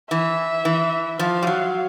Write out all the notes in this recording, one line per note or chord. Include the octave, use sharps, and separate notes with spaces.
E3 E5
E3
F3 F5
G3
F#3